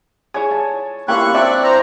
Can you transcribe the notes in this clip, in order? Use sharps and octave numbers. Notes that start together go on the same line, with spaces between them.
E4 F4 G#4 C#5 G#5
A5
A#3 B3 C#4 E4 F4 G4 C#6 F#6
C4 D4 F4 D5 E5
C5 A#5